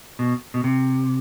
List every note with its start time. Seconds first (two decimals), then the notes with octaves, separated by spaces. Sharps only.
0.19 B2
0.54 B2
0.64 C3